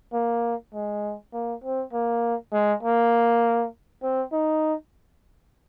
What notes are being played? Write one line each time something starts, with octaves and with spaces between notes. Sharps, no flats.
A#3
G#3
A#3
C4
A#3
G#3
A#3
C4
D#4